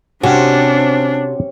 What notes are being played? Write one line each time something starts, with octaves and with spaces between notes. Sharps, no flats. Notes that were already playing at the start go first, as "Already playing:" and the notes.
C3 C#4 D4 F#4 G4 F#5